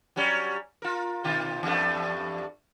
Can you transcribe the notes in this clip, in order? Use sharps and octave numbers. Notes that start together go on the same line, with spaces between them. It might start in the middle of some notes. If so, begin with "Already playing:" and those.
F#3 G3 C#4
F4 A#4
B2 D#3 F4
E2 G2 A3